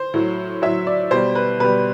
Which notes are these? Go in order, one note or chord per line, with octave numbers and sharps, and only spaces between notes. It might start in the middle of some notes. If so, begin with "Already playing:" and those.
Already playing: C5
A2 F#3
A2 F#3 E5
D5
B2 G3 C5
B4
B2 G3 B4